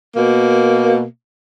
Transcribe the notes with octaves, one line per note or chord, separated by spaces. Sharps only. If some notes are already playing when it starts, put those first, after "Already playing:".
B2 A#3